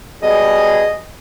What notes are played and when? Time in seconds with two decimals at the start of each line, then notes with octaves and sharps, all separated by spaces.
0.23 B2 G3 G#4 D#5